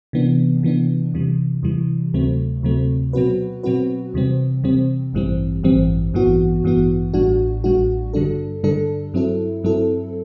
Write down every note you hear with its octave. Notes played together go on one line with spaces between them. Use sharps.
C3 E3 B3 D4
C3 E3 B3 D4
E2 C3 E3 G3
E2 C3 E3 G3
D2 C3 F#3 A3 C4
D2 C3 F#3 A3 C4
B2 F#3 C4 F#4 B4
B2 F#3 C4 F#4 B4
E2 C3 G3 C4
E2 C3 G3 C4
A1 G2 E3 G3 C4
A1 G2 E3 G3 C4
A1 G2 E3 B3 F#4
A1 G2 E3 B3 F#4
A1 A2 G3 D4 F#4
A1 A2 G3 D4 F#4
G2 D3 G3 D4 A4
G2 D3 G3 D4 A4
G2 F#3 C4 E4 A4
G2 F#3 C4 E4 A4